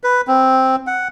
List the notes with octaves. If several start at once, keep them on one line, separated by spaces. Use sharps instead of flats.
B4
C4
F#5